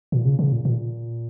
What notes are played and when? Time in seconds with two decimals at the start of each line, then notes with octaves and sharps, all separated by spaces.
0.12 A#2
0.25 C#3
0.39 C#3
0.52 A#2
0.65 A#2